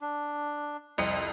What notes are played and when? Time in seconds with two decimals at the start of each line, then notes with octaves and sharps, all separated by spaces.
0.01 D4
0.98 C2 F2 C4 D#5 C#7